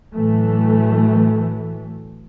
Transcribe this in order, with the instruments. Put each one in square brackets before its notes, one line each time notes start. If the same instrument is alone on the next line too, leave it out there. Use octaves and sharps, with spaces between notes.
[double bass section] A2 E3 F#3 A3